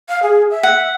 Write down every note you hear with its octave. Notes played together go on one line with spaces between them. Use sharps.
F5
G#4
E5
F#5